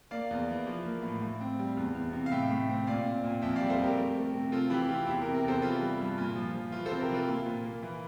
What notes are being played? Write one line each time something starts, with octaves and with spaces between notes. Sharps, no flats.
A#3 D5 F5
E2
E3
F3
A#3
A2
A2
C4
G3
E2
E2
C3
F5
A2 E5 G5
A2
C4
A#2 D5 F5
C4
A#2
F2 E5 G5
G3 D5 F5
A4 C5
F2
G4 A#4
A3
A3
C3
C4 F4 A4
E3 E4 G4
C4 F4
E2 E4 G4
G4 A#4
C3
G4 A#4
E2 A4 C5
E3 F4 A4
G3
G2
A#2 F4
F3
F3
E3 F4
A4 C5
C3
G4 A#4
E3 F4 A4
A#3 F4
A#2
A#3
E3